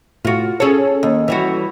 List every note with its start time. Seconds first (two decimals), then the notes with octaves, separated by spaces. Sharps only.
0.25 A2 F4 F#4
0.60 C#4 G#4 A4 C#5
1.03 D#2
1.28 E3 G3 F#4